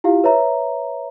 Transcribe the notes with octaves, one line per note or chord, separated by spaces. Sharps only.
E4 F4 G4 F5
B4 C#5 E5 A#5